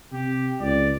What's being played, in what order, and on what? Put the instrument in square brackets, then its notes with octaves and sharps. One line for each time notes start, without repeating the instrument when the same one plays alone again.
[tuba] C3 [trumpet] G4
[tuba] C#2 [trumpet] D5